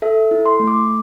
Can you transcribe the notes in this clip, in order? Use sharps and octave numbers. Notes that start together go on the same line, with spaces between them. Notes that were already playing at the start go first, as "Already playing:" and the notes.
A4 E5
E4
C6
A3
D6